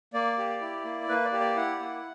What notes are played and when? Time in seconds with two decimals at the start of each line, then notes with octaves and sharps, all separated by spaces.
0.14 A#3 D5
0.38 G4
0.61 E4
0.85 A#3
1.09 A#3 B4
1.24 D5
1.33 G4
1.40 D5
1.56 E4 F#5
1.80 A#3